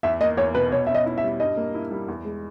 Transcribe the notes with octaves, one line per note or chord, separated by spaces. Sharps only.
E2 E5
A#3 D#5
E2 C#5
B2 B4
B2 C#5
C#4 E5
D#5
E4
E5
G3
G2 D#5
A#3
E4
G3
E2
G#3